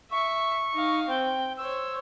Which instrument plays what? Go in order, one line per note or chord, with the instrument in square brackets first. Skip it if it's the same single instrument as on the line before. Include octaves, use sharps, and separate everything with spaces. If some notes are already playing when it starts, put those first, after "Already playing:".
[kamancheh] E5 [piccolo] C#6
[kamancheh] D#4 F5
[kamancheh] C4 [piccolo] G5
[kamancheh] C5 C#5 [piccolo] E6